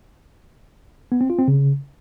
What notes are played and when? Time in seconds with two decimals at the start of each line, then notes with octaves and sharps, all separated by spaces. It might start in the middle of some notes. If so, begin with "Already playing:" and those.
1.12 B3
1.21 C4
1.30 F4
1.39 C4
1.48 C#3